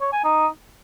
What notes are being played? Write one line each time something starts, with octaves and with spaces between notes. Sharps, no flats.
C#5
G#5
D#4